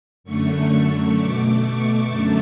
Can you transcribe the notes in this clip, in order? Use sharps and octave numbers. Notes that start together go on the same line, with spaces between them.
F#2 D3 A3 C#6
C#6
B2 A3 D6
C#6
F#2 D3 A3 A5